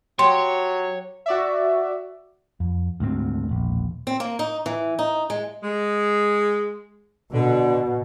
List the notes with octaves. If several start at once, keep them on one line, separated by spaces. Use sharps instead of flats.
F#3 G4 C#5 C6
F#4 D5 E5
F2
D2 G#2 G#3 C4
E1 A#1
C4
A#3
D#4
E3
D#4
G#3
G#3
B2 D3